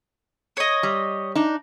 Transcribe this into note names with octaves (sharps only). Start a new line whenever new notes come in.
C#5 D#5
G3
D4 D#4